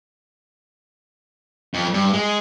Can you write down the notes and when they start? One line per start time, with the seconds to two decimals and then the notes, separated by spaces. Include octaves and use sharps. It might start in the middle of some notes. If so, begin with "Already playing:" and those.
1.74 F2
1.94 G2
2.13 G#3